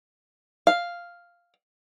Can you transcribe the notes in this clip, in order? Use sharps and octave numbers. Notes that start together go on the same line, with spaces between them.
F5